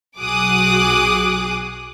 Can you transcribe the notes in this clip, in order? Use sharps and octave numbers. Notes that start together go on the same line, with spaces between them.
B1 F#4 G#4 D6 D#6 F#6